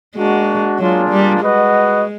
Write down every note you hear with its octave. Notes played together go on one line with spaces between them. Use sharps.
G#3 A#3 D4 F#4
F#3 A#3 D4 F4 G#4
G3
G#3 F#4 B4 D#5 F#5